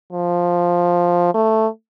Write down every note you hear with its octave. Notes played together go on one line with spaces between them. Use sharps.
F3
A3